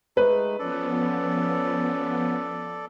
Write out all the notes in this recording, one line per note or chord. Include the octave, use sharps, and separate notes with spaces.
G#3 A3 D#4 B4
F3 B3 C#4 A4 D5